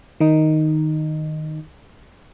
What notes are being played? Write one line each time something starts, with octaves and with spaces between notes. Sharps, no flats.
D#3 D#4